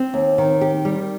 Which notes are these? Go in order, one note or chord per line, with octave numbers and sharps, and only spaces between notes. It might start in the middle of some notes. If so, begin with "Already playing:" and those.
Already playing: C4
D#2
D#3
G4
G3